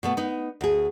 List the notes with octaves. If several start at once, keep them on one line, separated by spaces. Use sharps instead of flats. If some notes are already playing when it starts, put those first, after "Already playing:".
B2 A3 B3
B3 D#4
D2 G#4